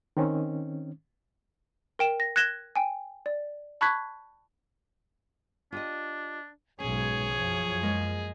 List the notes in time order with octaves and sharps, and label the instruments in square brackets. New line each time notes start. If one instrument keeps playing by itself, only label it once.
[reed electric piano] D#3 C4 C#4
[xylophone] A#4 G5 E7
A#6
F#6 G#6 A#6 E7 G7
G5 G#5
D5
A5 B5 C#6 F#6 G#6 B6
[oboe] D4 [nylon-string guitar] F4 G4 D#5
[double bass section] B1 G#2 [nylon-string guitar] C#4 [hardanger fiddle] G#4 [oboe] C#5
[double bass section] F#2 F3
[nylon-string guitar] G#3 A#3